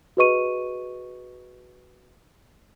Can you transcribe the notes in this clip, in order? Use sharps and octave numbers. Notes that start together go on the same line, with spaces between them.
F#4 G#4 B4 D#5 C#6 D#7